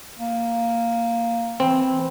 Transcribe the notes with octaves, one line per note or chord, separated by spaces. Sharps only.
A#3
E3 C4